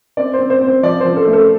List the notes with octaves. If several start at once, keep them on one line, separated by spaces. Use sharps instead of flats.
C4 D5
C5
C4
C5
C4
C5
F3 D5
F3 C5
A4
A3
A4